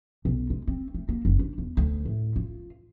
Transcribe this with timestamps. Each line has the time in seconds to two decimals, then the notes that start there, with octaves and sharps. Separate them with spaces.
0.25 B1
0.50 G#3
0.67 C4
0.94 A3
1.09 A#3
1.25 F#1
1.39 D4
1.58 E2
1.77 D2
2.05 A2
2.36 F4